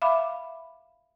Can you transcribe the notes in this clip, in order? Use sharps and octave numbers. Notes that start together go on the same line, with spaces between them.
E5 F5 B5 D6